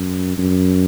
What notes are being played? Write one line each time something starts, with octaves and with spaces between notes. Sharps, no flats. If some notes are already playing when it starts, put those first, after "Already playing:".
Already playing: F#2
F#2